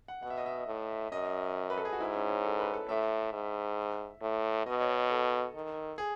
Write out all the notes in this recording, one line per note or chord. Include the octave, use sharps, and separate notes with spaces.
F#5
B2 F#5
E5
D#5
E5
A2
F#2 D#5
B4
A4
G#4
F#4
G#2 E4
C#4
C#4
A4
B4
A4
A2 E5
G#2
A2
B2 D#5
C#5
A4
D#3
G#4